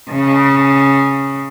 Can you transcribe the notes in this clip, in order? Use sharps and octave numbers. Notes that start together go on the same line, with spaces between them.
C#3